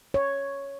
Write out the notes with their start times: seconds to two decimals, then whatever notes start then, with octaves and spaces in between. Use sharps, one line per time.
0.14 C#5